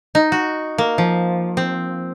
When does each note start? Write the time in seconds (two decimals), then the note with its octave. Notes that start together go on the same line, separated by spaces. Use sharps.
0.15 D#4
0.32 F#4
0.78 A#3
0.98 F3
1.57 C4